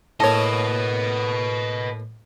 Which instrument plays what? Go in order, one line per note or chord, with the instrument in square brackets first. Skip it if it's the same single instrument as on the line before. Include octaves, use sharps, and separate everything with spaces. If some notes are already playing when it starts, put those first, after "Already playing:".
[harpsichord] A2 A#3 [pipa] A4 C#5 [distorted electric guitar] B4 D#5